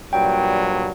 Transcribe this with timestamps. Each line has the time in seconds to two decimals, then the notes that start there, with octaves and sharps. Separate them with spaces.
0.13 G2 A#2 F#3 G5